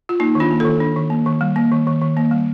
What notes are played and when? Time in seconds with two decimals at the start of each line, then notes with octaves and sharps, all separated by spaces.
0.09 F4
0.20 A#3 D#4
0.35 D#3 D4 F4
0.51 A#3
0.60 D#3 F4 A4
0.80 D4
0.96 D#3
1.10 A#3
1.26 D#3
1.41 G3
1.56 A#3
1.72 D#3
1.87 D#3
2.02 D#3
2.17 A#3
2.31 G3